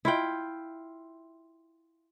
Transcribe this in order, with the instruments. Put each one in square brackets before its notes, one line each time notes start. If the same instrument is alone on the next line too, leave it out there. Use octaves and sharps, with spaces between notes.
[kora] E4 F4 G5